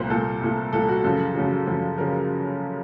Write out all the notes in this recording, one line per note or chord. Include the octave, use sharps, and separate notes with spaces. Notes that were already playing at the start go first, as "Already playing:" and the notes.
Already playing: C2 A#2 A3 A#4 C5
C2 A#2 A3 A4
C2 A#2 A3
C2 A#2 A3 A4
F#4
F#2 C#3 F3 A4
F#2 C#3 F3
F#2 C#3 F3
C#3 F3 A#4